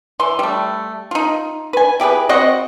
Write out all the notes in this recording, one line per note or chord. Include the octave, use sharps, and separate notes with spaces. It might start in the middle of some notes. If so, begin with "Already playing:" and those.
E3 C6
G3 A3
D#4 F4
B4 G#5
E4 G4 G#4 B4
C4 F#4 D#5 F#5